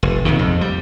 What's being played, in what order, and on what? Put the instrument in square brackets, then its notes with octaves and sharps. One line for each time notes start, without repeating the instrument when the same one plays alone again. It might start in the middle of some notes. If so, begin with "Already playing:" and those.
[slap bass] F1
A#1 D#2 C3 D#3
F2
G3